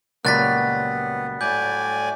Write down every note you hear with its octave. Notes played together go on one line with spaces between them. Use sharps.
C#2 A#2 F#3 G3 B3 F#6 A6 B6
A2 D5 G#5 G6